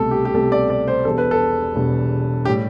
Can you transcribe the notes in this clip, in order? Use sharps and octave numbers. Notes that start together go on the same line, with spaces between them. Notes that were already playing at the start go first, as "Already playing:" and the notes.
Already playing: C2 B2 A3 A4
G4
G4
C2 B2 A3 A4
D5
D5
C5
E1 E2 B2 G3 A4
B4
A4
E1 E2 B2 G3
A2 G3 G4